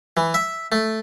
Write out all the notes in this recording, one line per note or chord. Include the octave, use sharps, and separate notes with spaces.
E3
E5
A3